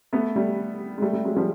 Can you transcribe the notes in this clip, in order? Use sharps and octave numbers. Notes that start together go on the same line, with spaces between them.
A3 B3
G3 A3
G#3
G3 A3
G3 A3
F#3 G#3
F3 G3